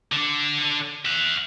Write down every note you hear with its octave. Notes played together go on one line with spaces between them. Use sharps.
D3 D4
E5 F#5